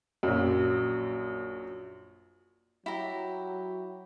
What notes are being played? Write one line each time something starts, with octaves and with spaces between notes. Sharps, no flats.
A#1 F#2
F#3 E4 G4 A#5